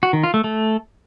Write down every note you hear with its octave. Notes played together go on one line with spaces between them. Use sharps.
F#4
D#3
F4
A3
A3